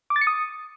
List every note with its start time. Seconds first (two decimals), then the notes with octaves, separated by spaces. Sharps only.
0.10 D6
0.16 A6
0.21 C#7
0.27 D#6